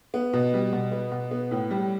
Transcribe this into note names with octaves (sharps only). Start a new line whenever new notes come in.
B3
B2
G3
B2
B3
B2
B3
A2
G3